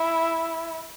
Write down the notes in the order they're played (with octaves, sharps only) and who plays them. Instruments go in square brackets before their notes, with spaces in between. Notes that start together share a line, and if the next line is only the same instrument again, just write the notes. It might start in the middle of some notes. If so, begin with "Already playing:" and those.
Already playing: [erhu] E4